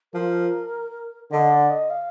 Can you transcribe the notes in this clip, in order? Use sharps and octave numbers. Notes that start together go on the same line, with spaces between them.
F3 A#4
D3 D#5
D5
D#5
F5